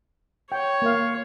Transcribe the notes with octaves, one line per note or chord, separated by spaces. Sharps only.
C#5 G5
A#3 F5